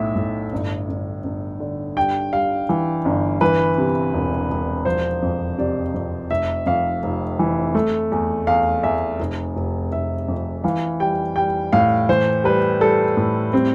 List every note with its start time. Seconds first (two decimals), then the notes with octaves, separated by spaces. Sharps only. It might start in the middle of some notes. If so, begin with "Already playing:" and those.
Already playing: B1 A2 E5
0.16 A2
0.52 G1
0.89 G1
1.24 G1
1.60 D3
1.97 G2 G5
2.33 G3 F5
2.69 E3
3.05 G1
3.41 E3 B4
3.78 C3
4.14 E1
4.50 E1
4.85 F3 C5
5.22 F2
5.58 C3 D5
5.94 F2
6.30 F1 E5
6.66 F2 F5
7.03 F1
7.39 E3
7.75 A3
8.12 E2
8.47 E2 F5
8.83 E2 E5
9.19 F1
9.56 F1
9.92 F1 E5
10.28 F2
10.64 E3 F5
11.00 G3 G5
11.36 G3 G5
11.73 A2 F5
12.09 E3 C5
12.44 G3 B4
12.80 G3 A4
13.17 A2
13.53 G3 C4